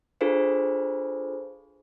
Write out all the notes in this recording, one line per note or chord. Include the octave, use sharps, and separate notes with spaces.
D4 F4 G#4 A4 B4 C5